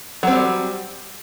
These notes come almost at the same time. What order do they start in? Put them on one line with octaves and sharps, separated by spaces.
F#3 C4 G3